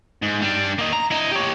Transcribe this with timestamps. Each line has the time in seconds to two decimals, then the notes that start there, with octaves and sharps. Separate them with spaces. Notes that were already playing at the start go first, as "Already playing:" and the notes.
0.22 G#2
0.42 G3 D4
0.78 A#3 D#4
0.93 A#5
1.11 E4 D#5
1.31 G4 C#5